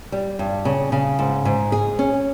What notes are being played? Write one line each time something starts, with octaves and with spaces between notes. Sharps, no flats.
G3
G2
C#3
C#3
G#2
G#2
G#4
C#4